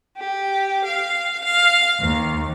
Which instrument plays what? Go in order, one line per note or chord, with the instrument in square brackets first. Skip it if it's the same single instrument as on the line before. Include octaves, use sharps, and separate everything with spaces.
[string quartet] G4
F5
F5
D#2